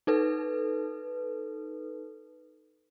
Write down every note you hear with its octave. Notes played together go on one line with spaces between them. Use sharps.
D#4 A4 B4